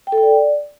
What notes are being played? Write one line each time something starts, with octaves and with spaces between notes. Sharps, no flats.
G5
A4
G5
D5